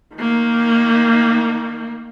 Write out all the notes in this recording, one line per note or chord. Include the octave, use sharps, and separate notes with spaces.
D#3 A#3